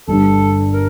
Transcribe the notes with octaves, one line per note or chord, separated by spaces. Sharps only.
G1 G2 D3 A4
A#4